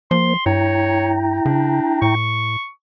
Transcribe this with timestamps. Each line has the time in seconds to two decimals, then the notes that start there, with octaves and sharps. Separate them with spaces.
0.11 F3 A#3 C5 C6
0.46 G2 E4 C#5 G5 A#5
1.45 C#3 D4
2.02 A2 C#6